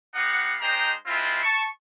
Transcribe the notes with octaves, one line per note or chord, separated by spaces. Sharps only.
B3 D#4 G4 F5 F#5
G#3 D4 D#4 C5 G5 A#5
G#3 C4 E4 F4
A5 C#6